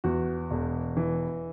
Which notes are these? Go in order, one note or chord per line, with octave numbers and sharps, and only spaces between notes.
E2 F#4
E1
E3